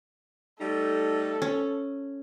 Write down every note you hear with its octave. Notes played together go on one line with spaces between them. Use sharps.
G3 A3 D#4 A4
C#4